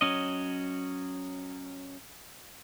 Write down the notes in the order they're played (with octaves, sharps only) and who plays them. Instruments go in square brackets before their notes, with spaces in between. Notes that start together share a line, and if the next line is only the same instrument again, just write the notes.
[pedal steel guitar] F#3 C#4 D#5